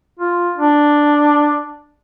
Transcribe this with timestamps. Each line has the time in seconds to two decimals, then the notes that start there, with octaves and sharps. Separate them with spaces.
0.19 F4
0.57 D4